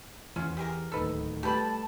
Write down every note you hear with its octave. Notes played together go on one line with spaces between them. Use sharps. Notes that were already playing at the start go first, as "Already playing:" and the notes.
E2 C#4 F4
G4 G#4 A#4
D1 D#2 D#4 A4 B4
G3 A3 G4 B4 A5 B5